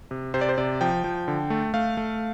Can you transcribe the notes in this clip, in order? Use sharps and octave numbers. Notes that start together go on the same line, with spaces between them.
C3
C3 C5
D5
C5
C3 D5
F3 G5
F3
D3
A3
A3 F5
A3